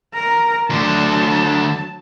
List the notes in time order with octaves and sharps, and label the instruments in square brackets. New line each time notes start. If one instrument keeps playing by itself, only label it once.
[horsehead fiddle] A#4 A#5
[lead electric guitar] D2 D3 [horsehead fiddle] F#3 A5